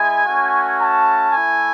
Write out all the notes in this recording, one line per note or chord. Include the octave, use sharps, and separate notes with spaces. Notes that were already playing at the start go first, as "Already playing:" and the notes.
Already playing: G#3 E4 G#5
A3 C#4 F#4
A5
A3 E4 G#5